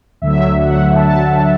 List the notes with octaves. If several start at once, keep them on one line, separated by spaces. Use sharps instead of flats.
D2 D3 F#3 E5
F#5
D2 D3 F#3 A5